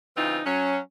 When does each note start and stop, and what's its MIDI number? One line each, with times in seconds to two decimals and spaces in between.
0.16 0.40 49
0.16 0.40 52
0.16 0.40 60
0.16 0.40 63
0.16 0.40 65
0.45 0.78 54
0.45 0.78 61